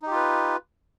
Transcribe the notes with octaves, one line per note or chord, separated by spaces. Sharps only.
D#4 F4 G4 B4